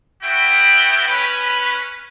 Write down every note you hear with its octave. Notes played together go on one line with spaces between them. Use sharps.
B3 E4 F#4 G5
C#4 B4